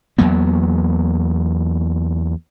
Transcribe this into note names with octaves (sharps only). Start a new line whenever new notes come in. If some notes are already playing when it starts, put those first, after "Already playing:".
E2 F#3 A#3 B3